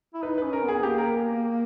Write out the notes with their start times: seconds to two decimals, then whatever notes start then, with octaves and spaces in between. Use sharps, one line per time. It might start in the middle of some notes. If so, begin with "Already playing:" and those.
0.14 E4
0.23 D#4 B4
0.38 B4
0.43 C#4
0.53 A#4
0.63 B3
0.68 G#4
0.83 A#3 G4
0.98 A#4